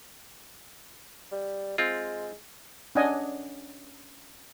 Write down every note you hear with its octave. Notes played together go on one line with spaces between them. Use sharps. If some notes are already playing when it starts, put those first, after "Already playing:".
G3
G#3 C4 F4
C#4 D4 D5 D#5 F#5 G#5